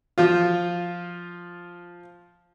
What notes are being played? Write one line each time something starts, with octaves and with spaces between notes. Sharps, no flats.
F3 F4